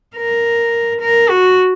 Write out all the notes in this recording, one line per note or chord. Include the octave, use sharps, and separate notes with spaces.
A#4
A#4
F#4